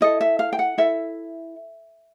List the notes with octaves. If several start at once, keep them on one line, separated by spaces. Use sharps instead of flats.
E4 A4 D#5
E5
F5
G5
F#5
E4 A4 E5